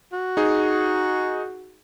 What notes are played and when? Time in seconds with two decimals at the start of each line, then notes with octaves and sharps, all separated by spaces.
0.13 F#4
0.37 D#4 G#4